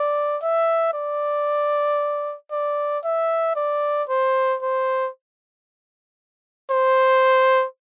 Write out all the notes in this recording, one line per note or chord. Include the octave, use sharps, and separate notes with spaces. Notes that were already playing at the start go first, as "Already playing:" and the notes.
Already playing: D5
E5
D5
D5
E5
D5
C5
C5
C5